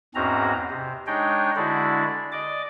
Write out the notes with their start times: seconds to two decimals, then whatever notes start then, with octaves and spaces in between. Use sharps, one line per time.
0.15 E2 G#2 C4 C#4 F#4 A#5
0.71 C3
1.07 G#3 D4 D#4 C#5 D#5 G5
1.56 D3 G#3 D4 E4 F#4 D5
2.32 D5 D#5 D6